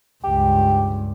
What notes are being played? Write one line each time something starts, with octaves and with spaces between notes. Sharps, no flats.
C#2 G2 G4